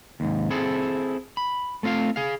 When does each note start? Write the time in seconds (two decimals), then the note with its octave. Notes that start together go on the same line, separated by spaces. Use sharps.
0.20 D#2 G#2
0.51 C4 E4 G#4 A4
1.37 B5
1.83 A3 C4 F4 C5 F5
2.16 G#4 F5